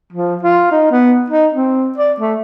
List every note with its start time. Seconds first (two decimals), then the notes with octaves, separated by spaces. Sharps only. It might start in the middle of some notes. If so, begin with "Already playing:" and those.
0.13 F3
0.43 F4
0.72 D#4
0.91 B3
1.30 D#4
1.54 C4
1.98 D5
2.20 A3